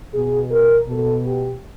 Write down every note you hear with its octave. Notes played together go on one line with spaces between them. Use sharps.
B2 G#4
A#4
B2 A4
G4